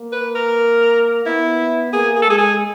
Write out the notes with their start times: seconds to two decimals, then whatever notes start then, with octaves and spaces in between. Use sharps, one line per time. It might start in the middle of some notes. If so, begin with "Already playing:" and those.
Already playing: A#3
0.12 B4
0.35 A#4
1.25 B3 E4
1.93 A#3 G#4
2.16 G#4
2.22 A4
2.27 G#3 G#4
2.38 G#4